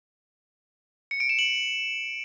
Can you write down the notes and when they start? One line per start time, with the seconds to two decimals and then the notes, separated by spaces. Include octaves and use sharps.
1.11 C#7
1.20 D7
1.29 E7
1.39 F#7